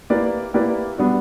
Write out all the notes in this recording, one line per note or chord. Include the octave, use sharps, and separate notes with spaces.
A#3 E4 G4 B4 D5
A#3 E4 G4 B4 D5
G3 B3 D4 F#4